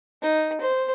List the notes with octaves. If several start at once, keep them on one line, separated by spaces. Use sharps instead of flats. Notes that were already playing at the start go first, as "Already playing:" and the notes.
D#4
C5